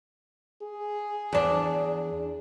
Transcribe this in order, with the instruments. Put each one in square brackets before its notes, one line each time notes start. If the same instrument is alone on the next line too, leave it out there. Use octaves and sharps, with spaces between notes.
[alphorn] G#4
[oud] E2 D4